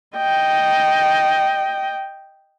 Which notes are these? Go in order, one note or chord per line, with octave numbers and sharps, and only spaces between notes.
D#5 G5